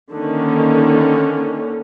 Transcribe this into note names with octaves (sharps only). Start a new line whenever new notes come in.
D3 D#3 A#3 C#4